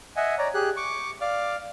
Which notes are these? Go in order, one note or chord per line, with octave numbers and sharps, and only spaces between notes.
D#5 E5 F#5 G#5
C#5 D5 A#5
G4 G#4 F#6
C#6 D6
D5 F5 D6 F6